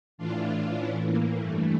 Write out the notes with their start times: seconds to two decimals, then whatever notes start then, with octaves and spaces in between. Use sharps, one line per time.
0.18 A2 E3 D4 F4
0.78 A2 E3 C#4 E4
1.07 A#3
1.37 G2 E3 A3